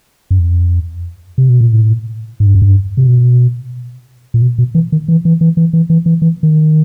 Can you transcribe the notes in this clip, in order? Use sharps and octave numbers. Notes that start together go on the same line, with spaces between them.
F#2
F2
C3
B2
A#2
A2
G#2
G2
F#2
G2
C3
B2
A#2
B2
B2
E3
D#3
E3
E3
E3
E3
E3
E3
E3
E3
D#3